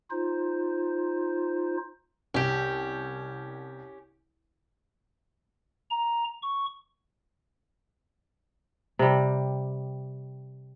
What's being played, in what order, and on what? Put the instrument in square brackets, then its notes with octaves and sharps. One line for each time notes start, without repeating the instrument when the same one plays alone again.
[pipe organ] D#4 F4 C5
[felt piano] C2 [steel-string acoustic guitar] C#4 G4
[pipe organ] A#5
C#6
[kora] C3 G3